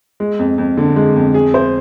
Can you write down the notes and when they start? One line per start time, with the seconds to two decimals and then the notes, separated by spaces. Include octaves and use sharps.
0.20 G#3
0.39 F2
0.58 F2
0.77 D3
0.96 G#3
1.16 F2
1.34 G#4
1.54 C5